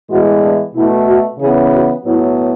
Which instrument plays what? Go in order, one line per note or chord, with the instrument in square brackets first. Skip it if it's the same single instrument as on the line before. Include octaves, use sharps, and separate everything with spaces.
[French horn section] A2 E3 G#3 B3 F#4
D4
B2 A3 E4
F#4
C#3 E3 B3 G#4
F#4
A2 F#3 B3 E4